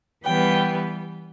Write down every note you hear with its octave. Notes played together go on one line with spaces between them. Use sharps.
E3 G3 B3 G5